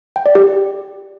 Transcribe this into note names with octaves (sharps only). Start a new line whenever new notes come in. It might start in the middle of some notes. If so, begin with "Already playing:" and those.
G5
D5
G4